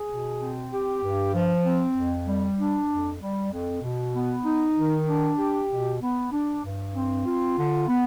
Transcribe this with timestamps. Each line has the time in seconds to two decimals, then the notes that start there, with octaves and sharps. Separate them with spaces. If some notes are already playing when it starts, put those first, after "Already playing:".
Already playing: G#4
0.09 B2
0.40 C4
0.72 G4
1.03 G2
1.34 F3
1.65 C4
1.96 F2
2.27 G3
2.59 D4
2.90 F2
3.21 G3
3.52 F2
3.82 B2
4.14 B3
4.45 D#4
4.77 D#3
5.08 D4
5.38 G4
5.70 B2
6.01 B3
6.32 D4
6.63 G2
6.95 C4
7.26 F4
7.56 D3
7.88 B3